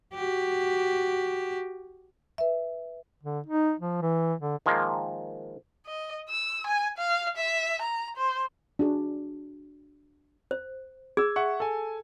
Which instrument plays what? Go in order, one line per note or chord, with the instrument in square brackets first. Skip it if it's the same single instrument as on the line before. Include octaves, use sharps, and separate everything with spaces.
[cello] F#4 G4
[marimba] B4 E5
[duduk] D3
D#4
F3
E3
D3
[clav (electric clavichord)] D#3 F3 G#3 A#3
[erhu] D#5
E6
G#5
F5
E5
A#5
C5
[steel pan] D4 F#4 G#4
[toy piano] C5
[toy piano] G#4 [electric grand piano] E6 G#6
[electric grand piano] E5 F#5 C#6
A4 G#5